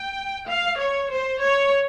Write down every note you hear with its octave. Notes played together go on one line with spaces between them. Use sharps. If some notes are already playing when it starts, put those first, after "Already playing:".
Already playing: G5
F5
C#5
C5
C#5